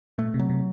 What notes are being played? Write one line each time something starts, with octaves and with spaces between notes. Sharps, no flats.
A#2 A3
C3
F#3
C3